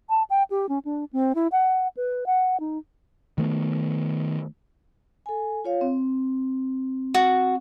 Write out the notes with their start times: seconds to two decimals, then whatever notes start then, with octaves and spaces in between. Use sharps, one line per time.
0.10 A5
0.30 G5
0.50 G4
0.69 C#4
0.85 D4
1.13 C4
1.35 E4
1.52 F#5
1.97 B4
2.26 F#5
2.60 D#4
3.38 D#3 A3 B3
5.26 A4 G#5
5.65 F4 C#5 F5
5.81 C4
7.14 F#4